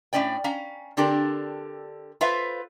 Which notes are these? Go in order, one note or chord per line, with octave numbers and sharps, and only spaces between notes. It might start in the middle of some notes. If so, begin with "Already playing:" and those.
A2 B3 C#4 D5 G5
C#4 F5 A#5
D3 C4 D4 G4 A4 A#4
F4 A4 B4 C5 E5 F5